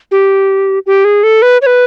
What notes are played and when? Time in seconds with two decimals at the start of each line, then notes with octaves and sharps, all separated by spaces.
0.11 G4
0.86 G4
1.05 G#4
1.23 A4
1.42 B4
1.62 C#5
1.66 B4